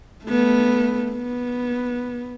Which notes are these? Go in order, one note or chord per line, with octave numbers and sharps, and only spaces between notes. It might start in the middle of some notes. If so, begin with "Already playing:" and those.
A3 B3
B3